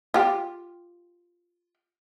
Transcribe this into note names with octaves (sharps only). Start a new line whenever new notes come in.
F4 G4